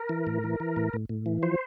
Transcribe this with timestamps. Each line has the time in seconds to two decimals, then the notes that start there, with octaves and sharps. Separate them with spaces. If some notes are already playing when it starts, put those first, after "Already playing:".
Already playing: A#4
0.09 E3
0.27 A2
0.44 E3
0.60 E3
0.76 A2
0.93 A2
1.09 A2
1.26 E3
1.43 F3 C5